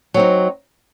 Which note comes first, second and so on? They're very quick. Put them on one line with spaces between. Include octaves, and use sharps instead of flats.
F#3 C4 D#4